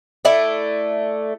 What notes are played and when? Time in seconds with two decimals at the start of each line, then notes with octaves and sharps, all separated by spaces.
0.25 A3 E4 D5